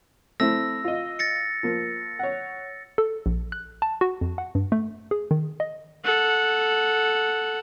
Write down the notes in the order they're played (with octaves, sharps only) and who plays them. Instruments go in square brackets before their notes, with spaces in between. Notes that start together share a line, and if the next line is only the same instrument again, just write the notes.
[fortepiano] A3 C4 E4 [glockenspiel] E6 A#6
[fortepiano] F4 D#5
[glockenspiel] A6 A#6 C#7
[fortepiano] F3 A#3
C#5 F#5
[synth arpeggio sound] A4
A#1
F#6
A5
F#4
F2
F#5
G2
A3
G#4
D#3
D#5
[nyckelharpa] A4 F#5